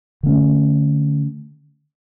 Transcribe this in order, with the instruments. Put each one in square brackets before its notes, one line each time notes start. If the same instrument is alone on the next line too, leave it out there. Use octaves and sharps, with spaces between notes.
[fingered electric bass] D3 A3 C#4